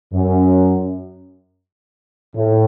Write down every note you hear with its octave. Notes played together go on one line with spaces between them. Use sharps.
F#2
A2